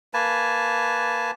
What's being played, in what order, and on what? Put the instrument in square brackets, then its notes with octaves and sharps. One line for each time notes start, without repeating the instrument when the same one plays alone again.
[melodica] A#3 B4 G#5 A5